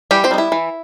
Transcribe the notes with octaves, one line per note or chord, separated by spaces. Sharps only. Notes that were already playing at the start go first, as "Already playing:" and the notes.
E3 G3 G4
C4 C5
G3 B3 D#4
E4
E3